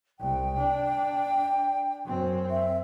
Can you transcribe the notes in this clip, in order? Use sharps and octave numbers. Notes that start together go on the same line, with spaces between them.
C2 G5
D4
F#2 C4
E5